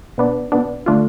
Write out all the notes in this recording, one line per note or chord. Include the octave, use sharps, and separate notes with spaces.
B2 B3 D4
B2 B3 D4
D3 A3 D4 F4